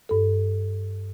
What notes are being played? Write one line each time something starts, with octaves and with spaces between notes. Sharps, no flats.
G2 A4